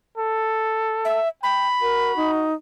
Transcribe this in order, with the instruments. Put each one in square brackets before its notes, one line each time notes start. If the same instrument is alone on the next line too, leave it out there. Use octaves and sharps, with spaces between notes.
[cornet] A4
[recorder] E5
[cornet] G5 [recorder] B5
[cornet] F#4 [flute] A#4
[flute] D#4